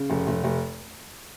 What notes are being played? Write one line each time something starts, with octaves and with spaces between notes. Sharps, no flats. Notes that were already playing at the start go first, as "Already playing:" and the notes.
Already playing: C#3
F1
F1
F1